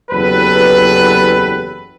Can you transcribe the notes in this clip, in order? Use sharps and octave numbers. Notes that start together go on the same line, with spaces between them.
F#1 E2 F#3 G4 A4 B4